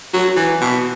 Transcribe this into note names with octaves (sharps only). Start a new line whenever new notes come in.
F#3
E3
B2